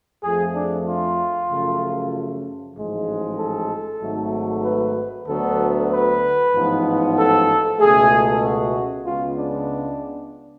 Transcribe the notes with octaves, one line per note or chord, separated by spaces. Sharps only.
F2 F3 A3 G#4
D4
F4
F#2 C#3 F3 A3
A1 G#2 F3 G#3
A4
G#1 G#2 F#3 A3
B4
D2 D3 F#3 B3 A4
B4
A1 G#2 F3 B3
A4
C#2 B2 A3 G#4
F#4
C#2 C#3 G#3 B3 F4
D4